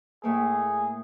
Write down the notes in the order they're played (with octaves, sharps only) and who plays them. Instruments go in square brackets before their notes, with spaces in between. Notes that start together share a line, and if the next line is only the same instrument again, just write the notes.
[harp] A2 A3 A#3 [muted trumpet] G#4